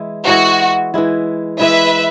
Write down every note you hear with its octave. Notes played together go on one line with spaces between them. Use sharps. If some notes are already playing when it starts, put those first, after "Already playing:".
Already playing: E3 G#3 E4
E3 G#3 E4 F#4
E3 G#3 E4
E3 G#3 E4 B4 E5